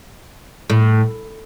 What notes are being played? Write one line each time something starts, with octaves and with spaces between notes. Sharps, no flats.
A2